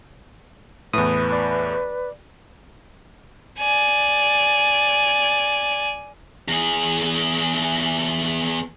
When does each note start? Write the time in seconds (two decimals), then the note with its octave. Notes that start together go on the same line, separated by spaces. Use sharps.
0.93 E2 A2 B4 D#6
1.32 D5
3.59 D5 G#5
6.48 E2 G#4